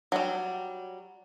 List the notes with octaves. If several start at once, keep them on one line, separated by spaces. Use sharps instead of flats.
F#3 G3